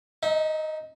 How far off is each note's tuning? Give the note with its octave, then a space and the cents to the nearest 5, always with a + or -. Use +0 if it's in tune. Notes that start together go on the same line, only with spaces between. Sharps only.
D#4 +0 E5 -40